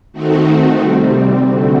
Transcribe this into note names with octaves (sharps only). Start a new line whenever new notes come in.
D#3 A3 C4 D#4 F#4
C3 G3 C4
D3 A3 C4 F#4